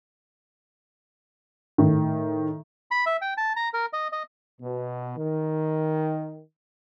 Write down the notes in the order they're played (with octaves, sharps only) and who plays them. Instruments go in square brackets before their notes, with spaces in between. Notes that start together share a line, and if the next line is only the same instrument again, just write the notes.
[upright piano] A2 D#3
[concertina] B5
E5
G5
A5
A#5
A#4
D#5
D#5
[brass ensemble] B2
D#3